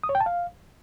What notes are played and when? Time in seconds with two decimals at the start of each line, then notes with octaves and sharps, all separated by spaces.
0.04 D#6
0.09 C#5
0.15 G5
0.20 A5
0.26 F5